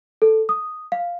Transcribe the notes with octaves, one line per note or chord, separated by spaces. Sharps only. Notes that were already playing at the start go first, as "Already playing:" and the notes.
A4
D#6
F5